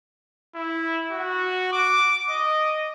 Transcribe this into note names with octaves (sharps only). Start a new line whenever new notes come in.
E4
F#4
D6
D#5